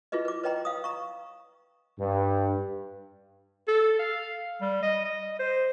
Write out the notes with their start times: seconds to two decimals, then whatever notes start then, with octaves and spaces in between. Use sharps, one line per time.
0.12 E4 F4 G#4 B4 D#5
0.25 B4 D6
0.43 B4 C#5 D#5 G5 A#5 C6
0.65 F5 D#6
0.84 A#5 C#6
1.99 G2
3.68 A4
3.99 F5
4.61 G3
4.82 D#5
5.05 D#5
5.39 C5